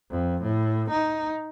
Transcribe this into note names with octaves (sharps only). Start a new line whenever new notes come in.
F2
A2
D#4